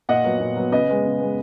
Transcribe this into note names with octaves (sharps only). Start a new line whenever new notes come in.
A#2 D#5 F#5
F#3 B3
A#2
F#3 B3
C#3 B4 D#5
G#3 B3
C#3
G#3 B3